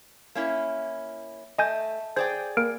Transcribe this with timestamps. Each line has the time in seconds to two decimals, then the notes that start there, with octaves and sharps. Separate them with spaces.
0.35 A#3 C#4 E4
1.58 A3 D#5 G#5 G6
2.16 G#4 C5 D5 G5
2.57 A#3 A#4 D7